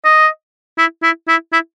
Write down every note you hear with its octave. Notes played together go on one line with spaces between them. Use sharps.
D#5
E4
E4
E4
E4